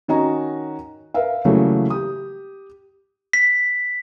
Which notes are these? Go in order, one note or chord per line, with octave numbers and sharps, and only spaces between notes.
D#3 C#4 F#4 D#5 G#5 A#5
A#4 B4 E5 F5
C#3 E3 F#3 G3 A3 A#3
G4 D#6
B6